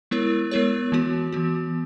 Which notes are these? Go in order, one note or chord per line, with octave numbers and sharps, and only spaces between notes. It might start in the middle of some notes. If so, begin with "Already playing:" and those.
G#3 B3 E4 A#4 C#5
G#3 B3 E4 A#4 C#5
E3 B3 F#4
E3 B3 F#4